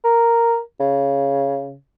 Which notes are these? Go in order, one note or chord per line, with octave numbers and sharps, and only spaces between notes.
A#4
C#3